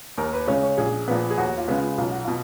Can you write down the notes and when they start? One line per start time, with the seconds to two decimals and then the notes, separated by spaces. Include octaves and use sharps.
0.18 D#2 A#4
0.33 B4
0.48 C#3 G#3 C#4 C#5
0.63 C#5
0.78 A#1 G#4
1.08 A#2 F3 B3
1.30 G#4
1.37 D#2 F#4
1.58 F4
1.68 C#3 G#3 B3
1.78 F4
1.98 B1 F4
2.11 F#4
2.25 B2 F4